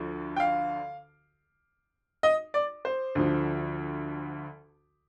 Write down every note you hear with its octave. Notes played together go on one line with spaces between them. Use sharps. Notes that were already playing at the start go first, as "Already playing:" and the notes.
Already playing: D2 D3 F3
G5
F5
D#5
D5
C5
D2 D3 F3